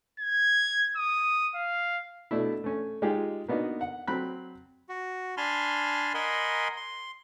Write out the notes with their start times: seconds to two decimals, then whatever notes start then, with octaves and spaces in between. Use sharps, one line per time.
0.20 G#6
0.97 D#6
1.55 F5
2.31 B2 A3 D4 E4
2.64 A3 C#4
3.02 G#3 D#4 F4 G4 G#4
3.48 A#3 B3 D4 D#4 F#4
3.81 F#5
4.07 F#3 C4 B5 F#6
4.89 F#4
5.37 D4 G#5 A5 B5 C6 F6
6.14 A#4 D#5 F#5 G#5 B5 C6
6.77 C6